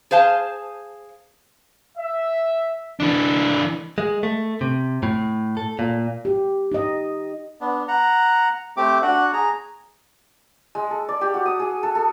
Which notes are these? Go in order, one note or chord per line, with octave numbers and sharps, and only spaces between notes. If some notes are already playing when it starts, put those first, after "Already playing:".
G#4 C5 F5 A5
E5
E3 D4
G#3
A3
C3
A2
A4
A#2
G4
D#4 D#5
B3 D4
F#5 A#5
A3 C4 G4 D6
D4 F#4 F#5
G#4 A#5
G#3
A4
D5
G4
F#4
D#6
G#4
A4
A4